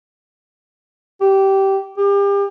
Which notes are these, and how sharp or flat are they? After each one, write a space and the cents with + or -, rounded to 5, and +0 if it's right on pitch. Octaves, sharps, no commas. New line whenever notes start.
G4 -15
G4 +35